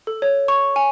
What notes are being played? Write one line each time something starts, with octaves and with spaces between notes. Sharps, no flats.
A4
C#5
C#6
G#5